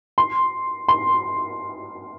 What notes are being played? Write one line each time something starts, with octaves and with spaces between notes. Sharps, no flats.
C6
C6